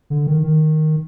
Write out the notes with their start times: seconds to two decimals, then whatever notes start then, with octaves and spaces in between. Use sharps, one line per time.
0.10 D3
0.27 D#3
0.43 D#3